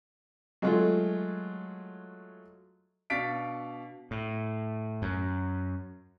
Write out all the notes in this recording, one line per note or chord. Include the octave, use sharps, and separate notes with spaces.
F#3 G#3 A3 F4
B2 D4 F5 A6 B6 D7
A2
F#2